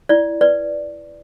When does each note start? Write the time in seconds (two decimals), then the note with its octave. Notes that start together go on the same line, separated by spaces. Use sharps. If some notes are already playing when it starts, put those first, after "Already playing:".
0.09 E4 D5
0.41 B4 D5